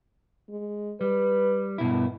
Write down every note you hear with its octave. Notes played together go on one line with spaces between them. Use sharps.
G#3
G3 B4
G2 B2 E4